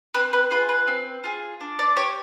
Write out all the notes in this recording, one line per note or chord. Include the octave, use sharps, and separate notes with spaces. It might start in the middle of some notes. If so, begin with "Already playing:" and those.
C4 B4
B4
F4 G#4 B4
B4
C4
F4 G#4
D4
D5
G4 C#5